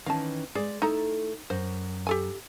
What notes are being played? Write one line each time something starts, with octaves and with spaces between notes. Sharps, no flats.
D#3 E3 C#4 F5 A5
G#3 G#4 D5
A3 D#4 E4 A4 A#5
F#2 C5
G4 A4 G#5